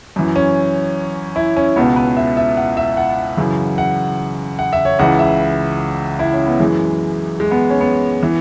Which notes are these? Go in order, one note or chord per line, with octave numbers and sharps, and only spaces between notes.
F#2 E3
C#4
E4
C#4
C#2 B2 B3
B4
E5
E5
F#5
E5
F#5
F#2 C#3 E3
F#5
F#5
E5
C#5
C#2 C#3 E3 F#5
E5
E4
C#4
B3
F#2 E3 G#3
G#3
B3
C#4
B3
E3